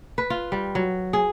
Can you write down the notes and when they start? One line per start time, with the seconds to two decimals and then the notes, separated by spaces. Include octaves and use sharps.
0.18 B4
0.30 F4
0.52 G3
0.75 F#3
1.13 G#4